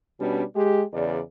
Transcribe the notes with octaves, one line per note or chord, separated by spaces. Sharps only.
B2 G3 C#4 D4
G#3 G4
E2 C#3 D5